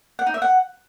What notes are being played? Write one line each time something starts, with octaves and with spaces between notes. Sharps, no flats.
F#5
D#4
E5
F#5